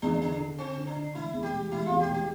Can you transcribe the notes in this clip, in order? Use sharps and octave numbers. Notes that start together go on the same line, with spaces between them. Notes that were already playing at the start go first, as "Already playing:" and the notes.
E2 D4
D3 D4
D3
D3 C4
D3
D4
D3
E1 E4
E2
G4
E1
E1 E4
E2 F4
G4
E1
G4